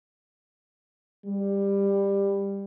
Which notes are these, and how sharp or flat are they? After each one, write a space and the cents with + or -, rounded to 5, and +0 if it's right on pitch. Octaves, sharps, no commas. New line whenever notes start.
G3 +15